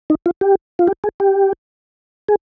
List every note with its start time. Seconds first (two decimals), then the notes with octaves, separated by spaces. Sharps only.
0.10 D#4
0.26 F4
0.41 G4
0.79 F4
0.88 G4
1.04 G#4
1.20 G4
2.28 G#4